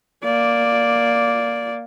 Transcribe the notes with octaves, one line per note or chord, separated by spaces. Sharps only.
A#3 D5